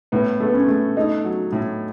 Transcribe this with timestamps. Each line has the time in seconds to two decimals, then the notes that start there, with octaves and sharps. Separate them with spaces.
0.12 A2 B3
0.40 A3
0.45 B3
0.54 C#4
0.68 A3
0.97 A3 D#4
1.24 F#3
1.52 A2